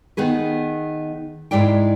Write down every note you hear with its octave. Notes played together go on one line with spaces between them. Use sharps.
D#3 B3 G#4 B4
G#2 G#3 E4 D5 G5